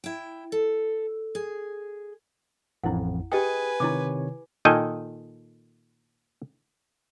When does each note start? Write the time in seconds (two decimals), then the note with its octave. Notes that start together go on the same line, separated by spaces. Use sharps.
0.04 E4 G5
0.52 A4
1.35 G#4
2.84 A1 F2 E4 F#5
3.32 G4 G#4 B4 D#5 G5 G#5
3.80 C3 D#3 E4 C#5 D6
4.65 A#2 D#3 A4 D#5 G5 G#5